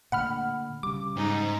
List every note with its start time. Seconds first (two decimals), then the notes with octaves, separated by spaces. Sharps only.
0.12 A#2 D3 A3 F#5 B5 F6
0.83 C#3 G3 D6
1.17 G#2 D#4